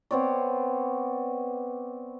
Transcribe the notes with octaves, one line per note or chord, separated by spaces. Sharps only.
B3 C4 C#5 D5